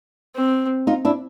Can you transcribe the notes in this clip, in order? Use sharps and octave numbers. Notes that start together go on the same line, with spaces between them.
C4
D#4 F4
D4 E4